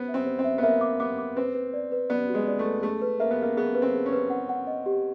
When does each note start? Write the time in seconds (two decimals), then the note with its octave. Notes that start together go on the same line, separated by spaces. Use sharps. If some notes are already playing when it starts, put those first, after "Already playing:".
Already playing: B3 C5
0.08 E5
0.14 C4
0.27 C5
0.39 C4
0.44 E5
0.58 B3
0.63 A#3 E5
0.81 D6
1.00 B3 D6
1.18 D6
1.36 C4 B4
1.55 B4
1.73 D5
1.92 B4
2.09 B3 D5
2.29 F#4
2.34 G#3
2.47 D5
2.59 A3
2.65 B4
2.83 A3 G#4
3.02 B4
3.20 A#3 E5
3.31 B3
3.38 A#3 G#4
3.57 B3 G#4
3.75 B4
3.82 C4
3.94 G#4
4.06 C#4
4.13 B4
4.30 F#5
4.49 F#5
4.67 D#5
4.86 G4